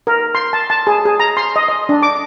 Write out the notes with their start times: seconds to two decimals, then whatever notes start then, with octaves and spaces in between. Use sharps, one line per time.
0.07 A#4
0.35 C6
0.53 A5
0.70 A5
0.87 G#4
1.05 G#4
1.20 A#5
1.37 C6
1.56 D#5
1.68 D#5
1.89 D4
2.03 D6